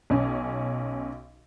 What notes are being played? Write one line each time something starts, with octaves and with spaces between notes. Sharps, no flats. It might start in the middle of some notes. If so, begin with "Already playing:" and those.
B1 C#4